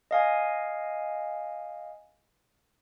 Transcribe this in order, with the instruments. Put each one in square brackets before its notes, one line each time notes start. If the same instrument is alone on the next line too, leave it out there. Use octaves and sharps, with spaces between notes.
[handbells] D#5 F5 G#5